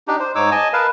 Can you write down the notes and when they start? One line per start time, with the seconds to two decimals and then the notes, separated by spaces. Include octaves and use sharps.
0.08 D4 D#4 G4
0.20 C5
0.35 G#2 D#4 C#5 D6 E6
0.52 D#5 G#5 A5
0.73 A#4 B4 F5 A5